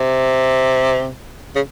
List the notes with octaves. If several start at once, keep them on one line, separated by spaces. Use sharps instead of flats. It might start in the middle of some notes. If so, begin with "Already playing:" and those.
Already playing: C3
C#3